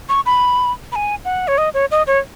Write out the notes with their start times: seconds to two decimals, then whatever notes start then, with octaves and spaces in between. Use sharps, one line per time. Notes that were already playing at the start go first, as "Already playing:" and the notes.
0.09 C#6
0.26 B5
0.92 B5
0.96 G#5
1.25 F#5
1.48 C#5
1.58 D#5
1.74 C#5
1.91 D#5
2.07 C#5